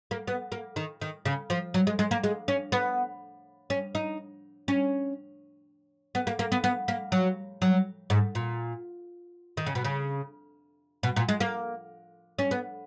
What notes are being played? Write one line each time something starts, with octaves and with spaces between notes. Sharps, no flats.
A#3
B3
A#3
D#3
D#3
C#3
F3
F#3
G#3
G#3
A#3
G#3
C#4
B3
C#4
D#4
C#4
B3
A#3
A#3
B3
B3
A#3
F#3
F#3
G#2
A#2
D#3
C#3
B2
C#3
B2
A#2
G#3
A#3
C#4
B3